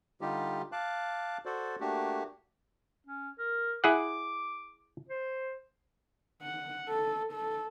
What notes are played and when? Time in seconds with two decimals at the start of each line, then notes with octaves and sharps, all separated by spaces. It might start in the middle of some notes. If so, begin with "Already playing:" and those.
0.21 D3 G3 D#4 F4 G4
0.72 F5 A5 D6 F#6
1.46 F#4 A4 C5 D5
1.81 A3 A#3 D4 F#4 G4
3.06 C#4
3.39 A#4
3.84 E4 G#4 F#5 D6
5.09 C5
6.42 F#5
6.89 A4
7.33 A4